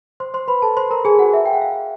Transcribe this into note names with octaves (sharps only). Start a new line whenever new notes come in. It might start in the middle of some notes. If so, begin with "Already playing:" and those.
C5 C6
C5 C6
B4 B5
A4 A5
C5 C6
A#4 A#5
G#4 G#5
F#4 F#5
E5
G5
F#5
F5